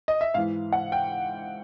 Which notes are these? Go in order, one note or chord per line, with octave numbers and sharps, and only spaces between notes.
D#5
E5
G#2 E3 F5
F#5
G5